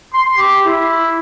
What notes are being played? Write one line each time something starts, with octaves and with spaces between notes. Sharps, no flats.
C6
G4
E4